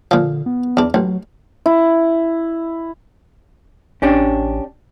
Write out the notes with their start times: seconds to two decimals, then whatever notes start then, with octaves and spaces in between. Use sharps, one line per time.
0.11 A#2 D3 F3
0.46 B3
0.77 E2 D4
0.94 A1 F#3
1.66 E4
4.02 A1 C#4 D4 G4